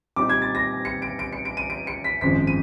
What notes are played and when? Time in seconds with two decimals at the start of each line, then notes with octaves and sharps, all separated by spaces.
0.16 A#2 G3 C4 D#4 D6
0.29 G#6
0.42 A6
0.55 A#6
0.85 C#7
1.02 D7
1.19 D7
1.33 C#7
1.45 D7
1.57 D#7
1.70 D7
1.87 C#7
2.04 B6
2.21 G#1 F#2 C#3 F3 G#3 B6
2.47 D#7